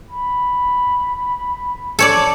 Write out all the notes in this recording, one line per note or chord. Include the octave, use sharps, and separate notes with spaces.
B5
A4 C#5 D5